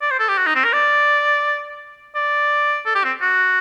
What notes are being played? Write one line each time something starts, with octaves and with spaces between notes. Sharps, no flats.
D5
C5
A4
G4
F#4
D#4
C4
A#4
D5
D5
A4
G4
C4
F#4